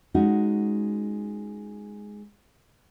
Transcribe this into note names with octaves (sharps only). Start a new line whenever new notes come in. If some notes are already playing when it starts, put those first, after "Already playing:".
G#3 C#4 D#4 F#4